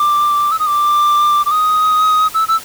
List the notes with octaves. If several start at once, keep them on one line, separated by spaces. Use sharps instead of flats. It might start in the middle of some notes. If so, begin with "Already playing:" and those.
Already playing: D6
E6
D#6
D6
D6
D#6
E6
E6